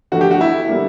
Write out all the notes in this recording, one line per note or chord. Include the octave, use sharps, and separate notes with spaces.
D3 F3 A3 F#4
G4
F#4
E4
D3 G3 A#3